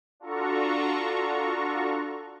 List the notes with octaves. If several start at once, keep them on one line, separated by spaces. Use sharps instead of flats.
D4 F4 F#4 A4 A#5 C#6